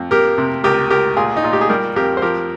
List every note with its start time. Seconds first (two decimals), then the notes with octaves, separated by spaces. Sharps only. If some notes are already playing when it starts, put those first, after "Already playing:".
Already playing: F2
0.11 A#3 G4 A#4
0.38 C3
0.64 C#2 G4 A#4
0.90 C#2 G4 A#4
1.17 A#2 F4 G#4
1.37 D#4
1.43 A#2 F4
1.53 G4
1.61 G#4
1.69 G3 G4 A#4
1.96 F2 G4 A#4
2.17 C5
2.22 F3 G4 A#4